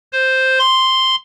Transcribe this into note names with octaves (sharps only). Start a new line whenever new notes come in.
C5
C6